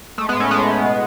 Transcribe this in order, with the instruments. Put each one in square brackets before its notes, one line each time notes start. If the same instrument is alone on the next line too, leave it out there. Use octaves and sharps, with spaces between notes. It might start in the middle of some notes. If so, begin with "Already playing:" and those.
[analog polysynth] G#3 A3
G#3 B3
A2
A3 C#4
A2 G#3 B3
A2
B2